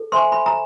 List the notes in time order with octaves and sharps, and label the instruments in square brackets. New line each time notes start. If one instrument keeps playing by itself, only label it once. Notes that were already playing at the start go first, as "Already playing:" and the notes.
Already playing: [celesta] A4
[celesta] C5 E5 G#5 C#6 [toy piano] C6
[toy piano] B5
A#5